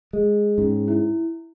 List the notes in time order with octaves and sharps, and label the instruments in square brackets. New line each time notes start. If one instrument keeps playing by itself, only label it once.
[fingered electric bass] G#3
[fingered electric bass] G#2 [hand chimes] C#4
[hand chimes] E4